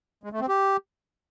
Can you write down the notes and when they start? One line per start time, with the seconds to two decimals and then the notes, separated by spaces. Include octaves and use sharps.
0.24 G#3
0.32 A3
0.40 C4
0.49 G4